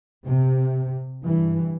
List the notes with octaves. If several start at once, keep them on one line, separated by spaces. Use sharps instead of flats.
C3
G2 E3